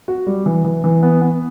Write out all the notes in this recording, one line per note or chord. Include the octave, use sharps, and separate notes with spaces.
F#4
G3
E3
E3
E3
B3
B3